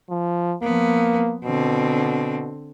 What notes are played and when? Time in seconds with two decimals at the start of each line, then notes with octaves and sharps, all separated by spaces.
0.10 F3
0.63 F3 A#3 B3
1.45 B2 D3 C4